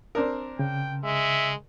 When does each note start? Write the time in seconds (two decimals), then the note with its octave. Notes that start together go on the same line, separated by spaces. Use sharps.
0.15 C4 D4 A#4
0.59 C#3 G5
1.04 G#3 E5